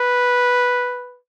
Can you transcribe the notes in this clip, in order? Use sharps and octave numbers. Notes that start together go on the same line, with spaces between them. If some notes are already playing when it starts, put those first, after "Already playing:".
Already playing: B4